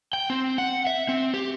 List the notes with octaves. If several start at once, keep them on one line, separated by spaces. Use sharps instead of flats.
G5
C4
F#5
E5
C4
G4